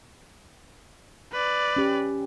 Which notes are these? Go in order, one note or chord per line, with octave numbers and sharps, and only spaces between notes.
B4 D5
C#4 G4